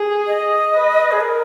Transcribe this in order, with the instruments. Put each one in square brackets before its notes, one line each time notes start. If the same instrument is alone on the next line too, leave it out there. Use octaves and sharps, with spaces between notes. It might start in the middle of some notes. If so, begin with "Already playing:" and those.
Already playing: [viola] G#4
[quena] D#5
[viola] B4
[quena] G#4
A#4